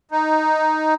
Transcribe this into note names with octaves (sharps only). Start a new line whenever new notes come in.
D#4